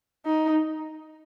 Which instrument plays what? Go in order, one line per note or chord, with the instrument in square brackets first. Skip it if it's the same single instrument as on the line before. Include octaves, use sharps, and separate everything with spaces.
[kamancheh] D#4